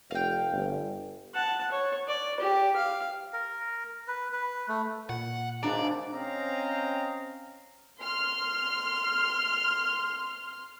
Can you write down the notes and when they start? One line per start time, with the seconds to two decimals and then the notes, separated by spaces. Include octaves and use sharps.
0.11 F1 F5 G5
0.52 G1
1.35 F#5 A5
1.72 C#5
2.08 D5
2.40 G4
2.76 F5
3.33 A#4
4.08 B4
4.33 B4
4.69 A3
5.09 A#2 F#5
5.63 G#1 C#2 G#2 D4 D5 A#5
6.14 C4 C#4 D#5 F5 G5 A#5
8.00 C6 F6